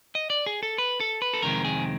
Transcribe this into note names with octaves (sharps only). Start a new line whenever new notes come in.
D#5
D5
G#4
A4
B4
A4
B4
A4
F2 C3 D#3 G#3 C4 A#4
G#4